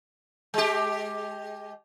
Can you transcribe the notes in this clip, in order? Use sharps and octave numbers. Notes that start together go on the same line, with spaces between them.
G#3 G4